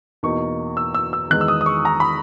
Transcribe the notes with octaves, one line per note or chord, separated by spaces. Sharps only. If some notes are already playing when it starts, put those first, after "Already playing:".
E2 B2 A#3 D#4 C#6
E6
E6
E6
E2 D#3 G#3 B3 F#6
E6
D#6
D#6
C#6
A#5
B5